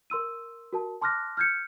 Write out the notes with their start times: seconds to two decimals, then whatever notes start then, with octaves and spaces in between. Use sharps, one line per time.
0.10 A#4 C6 E6 D#7
0.73 F#4 A#4 A5
1.01 A5 C6 D6 F6 F#6 A#6
1.37 F6 G6 G#6 C#7